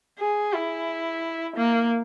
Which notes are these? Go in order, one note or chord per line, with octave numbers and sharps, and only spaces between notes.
G#4
E4
A#3